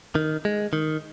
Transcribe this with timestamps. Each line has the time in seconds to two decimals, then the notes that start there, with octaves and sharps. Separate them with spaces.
0.15 D#3
0.45 G#3
0.73 D#3